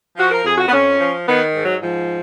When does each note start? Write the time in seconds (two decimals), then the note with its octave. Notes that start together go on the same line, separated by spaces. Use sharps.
0.17 F3 F#4
0.31 A#4
0.44 F2 G#4
0.57 F#4
0.67 B3
0.72 F2 C#4
0.99 F3
1.27 D#3 B3
1.54 G#2
1.64 F#3
1.82 G#2 F3